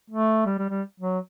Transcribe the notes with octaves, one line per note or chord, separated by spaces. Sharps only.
A3
G3
G3
G3
F#3